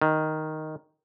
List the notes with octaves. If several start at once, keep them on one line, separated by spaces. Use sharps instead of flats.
D#3